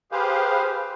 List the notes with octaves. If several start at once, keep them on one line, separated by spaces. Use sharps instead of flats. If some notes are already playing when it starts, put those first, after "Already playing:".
G4 G#4 B4 C5 F5